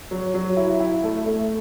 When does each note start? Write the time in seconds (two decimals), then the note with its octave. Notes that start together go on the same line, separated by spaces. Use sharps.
0.11 F#3
0.34 F#3
0.57 E4
0.80 E4
1.03 A3
1.26 A3